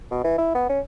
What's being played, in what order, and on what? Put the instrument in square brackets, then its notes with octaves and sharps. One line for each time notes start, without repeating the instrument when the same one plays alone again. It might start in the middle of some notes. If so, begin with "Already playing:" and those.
[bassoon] B2
E3
E4
B3
C#4